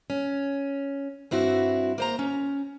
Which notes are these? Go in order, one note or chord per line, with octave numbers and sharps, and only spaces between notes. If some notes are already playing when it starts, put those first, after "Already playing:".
C#4
G2 C4 E4 F#4
A#3 C5 A#5
C#4